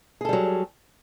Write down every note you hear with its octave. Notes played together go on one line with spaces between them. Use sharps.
F#3 G3 G#4 A4